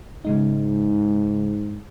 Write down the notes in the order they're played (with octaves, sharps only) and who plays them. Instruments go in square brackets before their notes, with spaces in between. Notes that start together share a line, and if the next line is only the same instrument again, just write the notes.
[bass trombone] G#2 [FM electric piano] C#3 G#3 D#4